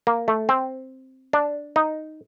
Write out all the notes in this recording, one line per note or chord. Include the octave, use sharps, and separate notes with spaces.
A#3
A3
C4
D4
D#4